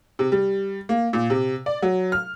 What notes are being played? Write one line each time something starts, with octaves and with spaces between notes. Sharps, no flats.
C3
G3
A#3
A#2
C3
D5
F#3
F6